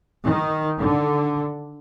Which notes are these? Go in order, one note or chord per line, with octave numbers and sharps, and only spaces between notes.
D#3
D3